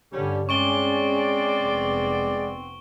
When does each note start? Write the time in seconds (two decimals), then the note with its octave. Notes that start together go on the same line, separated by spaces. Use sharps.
0.13 G2 D3 G3 C#4
0.49 G#3 C4 C#4 D5 C#6 D7 G7
1.62 F1 B3